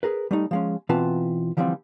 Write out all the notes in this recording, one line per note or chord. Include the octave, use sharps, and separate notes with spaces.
G#4 A#4 B4
G3 A3 D#4
F3 G#3 C#4
B2 E3 C4 F4 B4 A5
D3 E3 F3 G3 A#3 C4